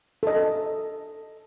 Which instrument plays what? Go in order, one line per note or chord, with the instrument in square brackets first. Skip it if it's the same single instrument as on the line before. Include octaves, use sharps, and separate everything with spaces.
[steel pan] A4 D#5